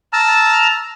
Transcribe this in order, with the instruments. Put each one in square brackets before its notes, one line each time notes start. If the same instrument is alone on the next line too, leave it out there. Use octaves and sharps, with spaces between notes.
[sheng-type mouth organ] A5 A#5 E6 F6